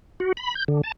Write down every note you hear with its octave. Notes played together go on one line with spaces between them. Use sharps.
F#4
B5
G6
D3
A5